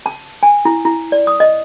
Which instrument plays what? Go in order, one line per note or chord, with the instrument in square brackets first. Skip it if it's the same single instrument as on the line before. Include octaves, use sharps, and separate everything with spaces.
[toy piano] A5
G#5
E4
E4
D5
D#6
D#5